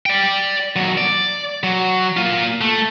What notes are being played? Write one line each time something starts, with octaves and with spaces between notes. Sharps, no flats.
D5 G5
D#2 F#3
D5
F#3
A#3 F4
A3